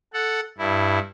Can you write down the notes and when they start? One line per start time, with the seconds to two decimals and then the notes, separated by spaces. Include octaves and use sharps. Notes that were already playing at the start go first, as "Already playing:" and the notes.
0.14 A4 F#5
0.58 G2 E4